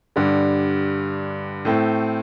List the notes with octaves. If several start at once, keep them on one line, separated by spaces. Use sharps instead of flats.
G2 D3 G3
A2 A3 C4